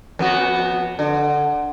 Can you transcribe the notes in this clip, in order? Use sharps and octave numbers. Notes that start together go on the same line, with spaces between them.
F2 B3 F#4
D3